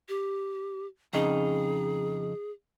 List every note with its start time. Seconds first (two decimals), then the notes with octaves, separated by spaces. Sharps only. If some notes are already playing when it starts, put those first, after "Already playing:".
0.09 G4
1.13 F2 C#3 D#4 G#4